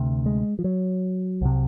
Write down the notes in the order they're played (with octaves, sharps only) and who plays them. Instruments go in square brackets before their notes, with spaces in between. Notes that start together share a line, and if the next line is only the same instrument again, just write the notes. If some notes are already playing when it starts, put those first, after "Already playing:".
Already playing: [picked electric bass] D2 C3
G#3
F3
F#3
C2 C3